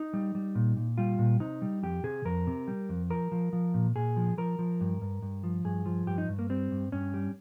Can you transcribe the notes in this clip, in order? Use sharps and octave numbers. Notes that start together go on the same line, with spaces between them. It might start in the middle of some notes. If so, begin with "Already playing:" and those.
Already playing: D#4
G3
G3
A#2
A#2
G3 F4
A#2
C3 D#4
G3
F2 G4
C3 G#4
F2 A#4
C3
G3
F2
F3 A#4
F3
F3
A#2
A#2 G#4
F3
F3 A#4
F3
G2
G2
G2
F3
G2 G#4
F3
G2 G4
D#4
G2
A#3
G3 C4
G2
G2 C#4
G3